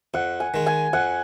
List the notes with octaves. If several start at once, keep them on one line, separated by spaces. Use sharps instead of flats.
F2 F#5
G#5
D#3 G#3
G#5
F2 F#5